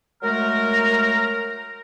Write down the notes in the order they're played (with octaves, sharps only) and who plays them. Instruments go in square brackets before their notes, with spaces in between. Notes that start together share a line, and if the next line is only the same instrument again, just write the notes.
[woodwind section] F#3 G#3 A3 A#4